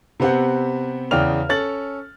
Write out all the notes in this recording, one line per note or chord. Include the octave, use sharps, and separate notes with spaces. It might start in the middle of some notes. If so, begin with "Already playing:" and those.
C3 B3 C4 G4 F#5
E2 C#3 D5 G5 F6 F7
C#4 A4 A6 F#7